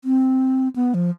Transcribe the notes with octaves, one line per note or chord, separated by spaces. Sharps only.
C4
B3
F3